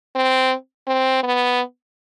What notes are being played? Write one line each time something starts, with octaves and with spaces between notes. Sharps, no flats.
C4
C4
B3